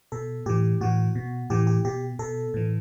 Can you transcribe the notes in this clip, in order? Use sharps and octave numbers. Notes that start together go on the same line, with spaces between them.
B2 A4
A2 E3 G4
A2 E3 F#4
B2
A2 E3 G4
G4
B2 G4
B2 A4
A2 E3